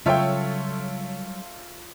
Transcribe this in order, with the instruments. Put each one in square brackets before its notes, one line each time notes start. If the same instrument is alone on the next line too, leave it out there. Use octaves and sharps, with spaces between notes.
[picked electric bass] C#3 [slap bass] F#3 G3 [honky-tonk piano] F4 A4 C#5 [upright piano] E5 G5